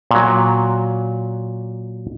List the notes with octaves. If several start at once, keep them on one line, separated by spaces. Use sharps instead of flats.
A#2 F#3